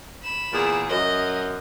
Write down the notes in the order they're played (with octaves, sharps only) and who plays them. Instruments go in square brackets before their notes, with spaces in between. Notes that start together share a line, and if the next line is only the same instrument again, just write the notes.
[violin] B5 E7
[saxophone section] E2 A#2 G#4
[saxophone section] F#2 [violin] D#5